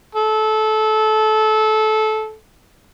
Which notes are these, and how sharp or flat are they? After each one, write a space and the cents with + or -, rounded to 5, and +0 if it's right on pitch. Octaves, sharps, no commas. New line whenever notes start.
A4 -20